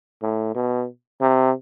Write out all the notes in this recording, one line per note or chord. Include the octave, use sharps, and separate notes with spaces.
A2
B2
C3